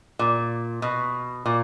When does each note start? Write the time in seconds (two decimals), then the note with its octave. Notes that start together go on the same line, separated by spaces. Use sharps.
0.19 A#2
0.82 B2
1.46 A#2